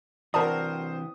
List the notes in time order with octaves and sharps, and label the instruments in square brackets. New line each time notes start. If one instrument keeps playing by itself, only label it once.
[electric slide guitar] C3 E3 [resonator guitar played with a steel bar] F#4 A#4 [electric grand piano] C5 D#6 [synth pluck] D5 A5